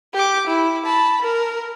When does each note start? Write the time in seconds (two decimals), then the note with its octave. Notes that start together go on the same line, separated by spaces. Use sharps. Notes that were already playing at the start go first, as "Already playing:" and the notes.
0.14 G4 D6
0.47 E4
0.86 A5 B5
1.22 A#4